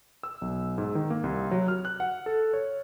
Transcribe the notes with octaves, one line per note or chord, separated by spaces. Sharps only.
E6
B1
G#2
D#3
A#3
C2
F#3
F6
F#6
F#5
A4
C#5